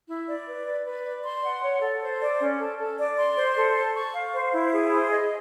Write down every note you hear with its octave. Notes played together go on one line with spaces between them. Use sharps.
E4
D5
B4
B4
B4
D5
C6
F#5
C#5
A4
C5
D5
C#4
A4
A4
D5
C6
C5
A4
A5
C#6
F5
C5
E4
G#4
C5
D#5